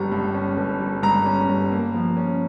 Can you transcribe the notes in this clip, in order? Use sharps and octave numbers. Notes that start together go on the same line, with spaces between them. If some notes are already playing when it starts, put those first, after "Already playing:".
Already playing: G1 G2 G3 C#4 A#5
G2
C#4
G1
G3
G2 A#5
C#4
G1
A#3
F3
C#4